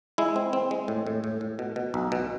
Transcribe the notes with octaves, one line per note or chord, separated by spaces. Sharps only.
G#3 E4
C4
C4
G#3
A2
A2
A2
A2
B2
B2
B1
B2